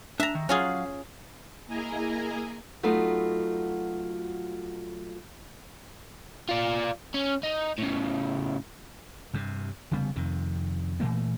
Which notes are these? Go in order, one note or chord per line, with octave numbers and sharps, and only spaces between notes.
D4 E5 A#5
D#3
F#3 C#4 F4 G#4 F5 F#5
A#3 E4 G#4 D#5 G#5 A#5
F#3 A3 B3 D#4 F4 F#4
F4 D5
C#4
D#4
A2 C#3
G2 C3
F1 C#3 G3 B3
F2 C3 D#3
A#2 E3 A3 A#3